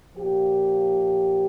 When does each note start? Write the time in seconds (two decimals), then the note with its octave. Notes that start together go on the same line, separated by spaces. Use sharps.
0.16 A#2 F3 G4